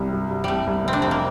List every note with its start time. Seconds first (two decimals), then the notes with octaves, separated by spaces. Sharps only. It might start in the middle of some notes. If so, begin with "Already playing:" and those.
Already playing: C2 G3
0.13 G2
0.31 G2
0.44 C2 G3 A3
0.67 C2
0.85 F1 C4
0.93 D4
1.02 F1 C4
1.11 A#3